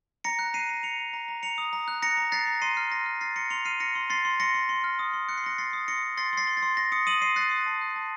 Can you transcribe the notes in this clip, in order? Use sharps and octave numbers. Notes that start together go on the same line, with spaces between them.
A#5 A#6 C#7
F#6
A#5 C7 D#7
A#5
A#5 C#7 F7
A#5
A#5
A#5
A#5 C#7 F7
D#6
A#5
F#6
A#5 A#6 C#7
A#5
F#6 A6 C7
A#5
C6 C7 D#7
F6
C6 A#6
F6
F6 A6 C7
C6 A#6 C#7
C6 C#7 F7
F6 C7 D#7
F6 A#6 C#7
C6
C6 A6 C7
C6
C6 A#6 C#7
C6
C6
F6
D#6
C6
F#6 C#7
C7
C6 A#6 C#7
C6 A6 C7
D#6
C6 A#6 C#7
D#6
C6 A6 C7
C6 A6 C7
C6
A6
C6
C6 A#6
D#6 A#6 C#7
D#6 D#7 F#7
C6 C7 D#7
F#6 A6 C7
D#6
A5
F#6
A5